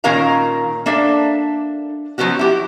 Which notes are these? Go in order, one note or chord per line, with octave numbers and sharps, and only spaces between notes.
A#2 D#3 C#4 A#4 F5 A#5
A#3 D4 A4 E5
F3 F#3 B3 C#4 F#4
E4 G4